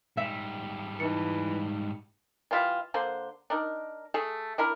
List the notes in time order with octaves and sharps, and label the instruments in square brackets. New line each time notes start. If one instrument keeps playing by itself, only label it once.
[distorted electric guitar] G#2 G3 [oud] E5
[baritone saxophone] E3 [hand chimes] D#4 C#7
[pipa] E3 G3 F4 E5
D3 A#3 D4 C5
D4 D#4 A#4
A3 G#4 A4
D4 E4 A#4